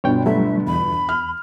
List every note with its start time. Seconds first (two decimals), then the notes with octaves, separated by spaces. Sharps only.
0.04 G1 B2 D3 C#5 G5
0.26 F#3 G3 A3 E5
0.67 E2 B5
1.09 F6